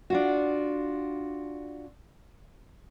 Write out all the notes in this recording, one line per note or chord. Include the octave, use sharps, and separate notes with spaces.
D4 F4 F#4